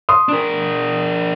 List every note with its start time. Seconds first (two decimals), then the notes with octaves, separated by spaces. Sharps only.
0.09 C6 D#6
0.29 D4 A#4